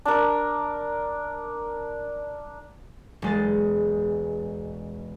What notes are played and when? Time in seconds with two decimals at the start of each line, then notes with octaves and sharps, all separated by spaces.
0.05 D4 A#4
3.22 E1 G#3 A6